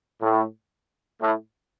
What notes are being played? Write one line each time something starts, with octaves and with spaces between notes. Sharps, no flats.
A2
A2